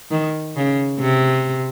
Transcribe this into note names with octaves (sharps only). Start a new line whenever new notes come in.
D#3
C#3
C3